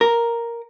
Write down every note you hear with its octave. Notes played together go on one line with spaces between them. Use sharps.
A#4